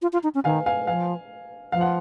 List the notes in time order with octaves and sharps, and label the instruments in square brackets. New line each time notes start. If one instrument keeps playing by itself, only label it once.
[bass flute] F4
F4
D#4
C#4
[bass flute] D#3 [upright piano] F5 G#5
[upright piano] F5 G#5
[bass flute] F3 [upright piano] F5 G#5
[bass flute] F3 [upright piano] F5
[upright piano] F#5